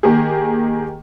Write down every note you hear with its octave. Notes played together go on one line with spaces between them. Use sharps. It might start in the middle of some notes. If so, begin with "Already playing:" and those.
D#3 A#3 G4 G#4